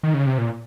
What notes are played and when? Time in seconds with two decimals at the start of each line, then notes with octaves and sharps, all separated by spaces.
0.03 D#3
0.14 C#3
0.27 C3
0.38 A#2